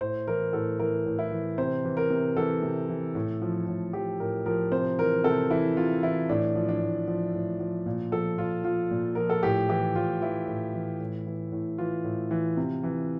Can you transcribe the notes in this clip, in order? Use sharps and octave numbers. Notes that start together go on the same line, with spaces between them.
A2 C5
E3 A#4
A2 A4
E3 A#4
A2
E4
E3
C3 C5
E3
A#4
C3
E3 A4
C3
E3
A2
F3
A2
F3 G4
A2 A#4
F3 A#4
C3 C5
E3 A#4
C3 A4
E3 E4
C3 F4
E3 E4
A2 D4
F3
D4
A2
F3
A2
F3
A#2
F3 A4
A#2 F4
F3 F4
A#2
F3 A#4
A4
A2 G4
E3 G4
A2 F4
E3 E4
A2
E3
A2
E3
A2
E3 F4
A2
E3
C3
E3